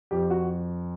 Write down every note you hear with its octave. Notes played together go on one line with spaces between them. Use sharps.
F2 G4
F#4